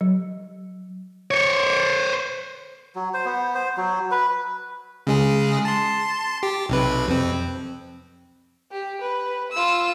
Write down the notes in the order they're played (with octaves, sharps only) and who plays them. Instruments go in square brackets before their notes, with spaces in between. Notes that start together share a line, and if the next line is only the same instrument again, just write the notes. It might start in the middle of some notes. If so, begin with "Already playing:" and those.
[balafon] F#3
[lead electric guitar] C5 C#5
[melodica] F#3
C5
B3
C5
F#3
B4
[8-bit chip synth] C#3 G#3 G#4
A5 C6
G4
B1 C3 B4
F2 C4
[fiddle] G4
B4
F4 E6